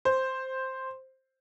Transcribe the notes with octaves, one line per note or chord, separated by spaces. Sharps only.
C5